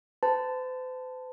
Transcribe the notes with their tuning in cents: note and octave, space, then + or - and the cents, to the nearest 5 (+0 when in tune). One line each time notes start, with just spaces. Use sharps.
C5 -45 A5 +0